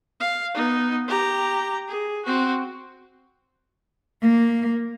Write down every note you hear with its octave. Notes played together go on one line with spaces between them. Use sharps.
F5
B3 D#4
G4 A#5
G#4
C4 F#4
A#3